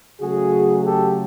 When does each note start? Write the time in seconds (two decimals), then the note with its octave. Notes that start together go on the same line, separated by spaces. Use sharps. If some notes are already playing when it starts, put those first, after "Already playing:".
0.21 C#3 F#3 A3 F#4 G#4
0.84 G4 A4